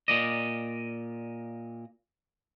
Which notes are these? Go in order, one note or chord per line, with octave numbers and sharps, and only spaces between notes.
A#2 D5 D#5